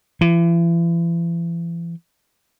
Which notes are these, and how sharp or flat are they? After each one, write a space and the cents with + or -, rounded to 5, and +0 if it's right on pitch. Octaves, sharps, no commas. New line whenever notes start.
E3 +40